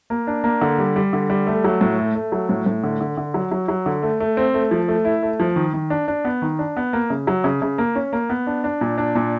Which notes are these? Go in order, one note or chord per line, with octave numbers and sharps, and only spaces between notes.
A#3
D4
A#3
D3
G3
G3
D3
G3
A3
F#3
A2
A3
A3
F#3
A2
A2
D3
D3
D3
F#3
F#3
F#3
D3
A3
A3
C4
A3
F3
A3
E4
A3
F3
D#3
D#3
D4
D4
B3
D#3
D4
B3
A#3
C#3
F#3
C#3
C#3
A#3
C#4
A#3
B3
D4
D4
A#2
D4
A#2